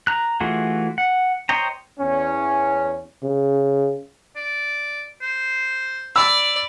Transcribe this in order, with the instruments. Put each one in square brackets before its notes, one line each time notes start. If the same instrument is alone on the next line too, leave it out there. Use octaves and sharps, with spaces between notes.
[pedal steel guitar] A#5 F#6
E3 A3 F4 F#4 G#4
F#5
C5 C#5 D#5 G5 A#5
[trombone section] E2 C#4
[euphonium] C#3
[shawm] D5
C5
[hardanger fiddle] D5 [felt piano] B5 E6